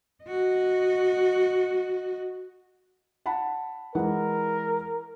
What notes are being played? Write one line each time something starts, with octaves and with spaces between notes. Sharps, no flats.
F#4 D#5
F#5 A5 B5
E3 G#3 A#4 F#5